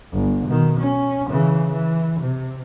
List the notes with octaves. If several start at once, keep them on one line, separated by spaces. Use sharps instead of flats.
G1
B2 D#3
C#4
C#3 E3
E3
C3